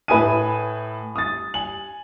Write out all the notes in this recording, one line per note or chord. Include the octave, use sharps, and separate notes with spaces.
A2 B4 E5 G#5 D#6 D#7
D#6 A6
G#5 F#7